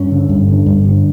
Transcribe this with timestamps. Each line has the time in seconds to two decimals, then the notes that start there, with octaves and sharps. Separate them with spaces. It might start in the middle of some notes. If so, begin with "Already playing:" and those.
Already playing: G2 C#4
0.11 D3
0.29 G2
0.48 D3
0.66 G2
0.84 D3